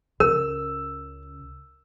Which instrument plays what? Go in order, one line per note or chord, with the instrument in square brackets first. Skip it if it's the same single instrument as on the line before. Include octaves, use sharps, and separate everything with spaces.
[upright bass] C#2 C#3 [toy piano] A#4 [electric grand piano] E6